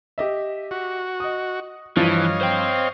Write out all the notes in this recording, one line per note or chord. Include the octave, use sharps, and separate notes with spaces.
G4 D#5 E5
F#4
D#5 D#6
G2 E3 F3 C#5 D#5 F5 A6
C5 G5